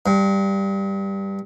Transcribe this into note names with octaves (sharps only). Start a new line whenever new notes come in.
G2